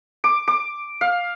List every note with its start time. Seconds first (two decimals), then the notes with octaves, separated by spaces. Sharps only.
0.24 D6
0.48 D6
1.01 F5